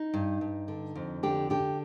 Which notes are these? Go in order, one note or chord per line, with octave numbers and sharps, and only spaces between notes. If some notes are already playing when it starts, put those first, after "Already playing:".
Already playing: D#4
G2
G2
D3
F2
D3 G4
D3 G4